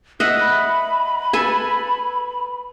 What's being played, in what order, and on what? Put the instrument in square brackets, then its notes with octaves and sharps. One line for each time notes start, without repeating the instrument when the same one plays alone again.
[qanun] D#5 E5 F#5 [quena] F#6
[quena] B5
[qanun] A4 B4 G#5